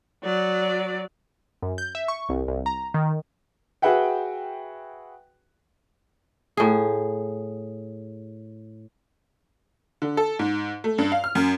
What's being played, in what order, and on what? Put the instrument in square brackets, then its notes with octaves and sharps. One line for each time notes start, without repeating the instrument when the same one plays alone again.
[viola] F#3 D5
[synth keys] F#2
G6
E5
C#6
C2
C2
A#5
D#3
[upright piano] F#4 G#4 B4 E5 F#5 G5
[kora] A2 G#4
[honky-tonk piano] D3
A4
G#2
A3
G2
F5
F6
F#2